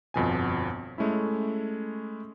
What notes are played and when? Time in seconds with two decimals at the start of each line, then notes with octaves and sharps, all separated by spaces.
0.14 G1 F2 B2 G#5
0.98 G#3 A3 C#4 E4